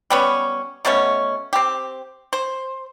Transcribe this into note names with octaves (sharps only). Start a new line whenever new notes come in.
G3 B3 C#4
B2 A3 B3 C#4
C4 G4
C5